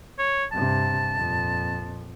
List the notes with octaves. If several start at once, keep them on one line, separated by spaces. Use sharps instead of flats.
C#5
G2 C3 A5
F2 A#2